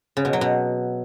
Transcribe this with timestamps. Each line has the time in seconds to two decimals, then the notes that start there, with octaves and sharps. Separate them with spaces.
0.17 C#3
0.25 B2
0.33 F#3
0.41 B2